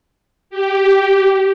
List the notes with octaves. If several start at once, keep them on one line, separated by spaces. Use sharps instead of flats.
G4